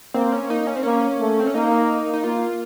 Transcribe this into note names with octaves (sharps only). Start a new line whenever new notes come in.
A#3 C4
C#4
A#3 D#4
C#4
C4
A#3 C#4
A3
C4
C#4
A#3 D#4
D#4
A#3 F4